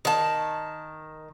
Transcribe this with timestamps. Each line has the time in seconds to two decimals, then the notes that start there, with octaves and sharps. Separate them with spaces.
0.05 D#3 A5